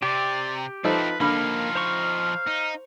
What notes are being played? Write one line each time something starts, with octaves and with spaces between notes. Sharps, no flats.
C3 G4 D5
F3 C4 D#4 E4 A4 B4
D3 F3 A#3 D#4 F5 B5
C5 A#5 C#6
D#4